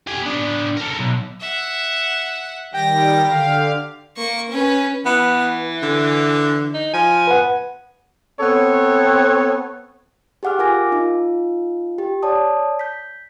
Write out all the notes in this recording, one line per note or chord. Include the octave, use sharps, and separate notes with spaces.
G4 G#5
B3 D4
A4 A#4
B1
E5 F#5
D#3 G3 G4 G5 A#6
D3 F5
A#3 C#6
C#4 B4
E3 B3
D3
D#4
F3 G#5
B4 F#5
B3 C4 A4 C#5
G4 G#4 F#5 D6 F6
F4 A#4 G#5 D6 A#6
D#4 F4
G4
C#5 D5 A5 D#6
G6 B6